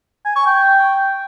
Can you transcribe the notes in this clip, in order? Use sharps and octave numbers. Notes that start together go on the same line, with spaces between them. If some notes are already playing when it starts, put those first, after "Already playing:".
G#5
C#6
G5